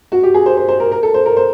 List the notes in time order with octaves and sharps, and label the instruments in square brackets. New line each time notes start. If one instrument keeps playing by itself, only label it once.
[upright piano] F#4
G4
G#4
C5
C5
C5
A#4
A#4
A4
C5
A#4
C5